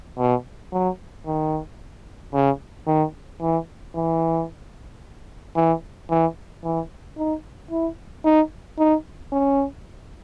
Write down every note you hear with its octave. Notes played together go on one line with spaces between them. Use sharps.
B2
F#3
D#3
C#3
D#3
E3
E3
E3
E3
E3
D#4
E4
D#4
D#4
C#4